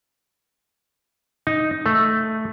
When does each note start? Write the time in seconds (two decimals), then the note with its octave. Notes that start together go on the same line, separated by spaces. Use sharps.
1.47 D#4
1.86 A3